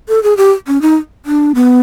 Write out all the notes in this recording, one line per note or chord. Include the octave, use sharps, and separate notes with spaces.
A4
G#4
G4
C#4
D#4
D4
B3